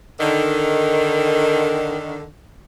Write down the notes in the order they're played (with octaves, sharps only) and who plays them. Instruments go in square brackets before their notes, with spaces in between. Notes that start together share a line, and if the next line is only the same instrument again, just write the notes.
[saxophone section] D3 D#3